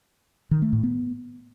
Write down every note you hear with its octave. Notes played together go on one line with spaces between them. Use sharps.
D#3
A3
A2
B3